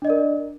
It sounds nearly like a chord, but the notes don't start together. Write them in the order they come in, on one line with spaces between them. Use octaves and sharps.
D4 D#5 D5 A#4